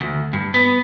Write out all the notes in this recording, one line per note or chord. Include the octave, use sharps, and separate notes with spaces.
D2
G2
B3